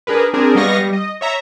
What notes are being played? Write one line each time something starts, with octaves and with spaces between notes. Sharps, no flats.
D4 G#4 A#4 B4
C4 D4 G#4 A#4
G3 B3 D#5 F5 C#6 A#6
G3
D#5
C#5 E5 A#5